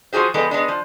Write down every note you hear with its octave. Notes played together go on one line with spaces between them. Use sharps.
F3 F4 F#4 G#4 C5
E3 G3 G#3 B3 A4
G#3 B3 D4
F3